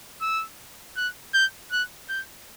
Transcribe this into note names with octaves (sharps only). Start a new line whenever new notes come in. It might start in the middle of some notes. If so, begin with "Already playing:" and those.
E6
F#6
G6
F#6
G6